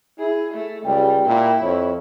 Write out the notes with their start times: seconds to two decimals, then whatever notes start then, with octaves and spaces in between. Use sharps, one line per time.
0.19 E4 G#4
0.54 A3
0.85 C#2 G3 G5
1.26 A#2 E4
1.62 F2 C#5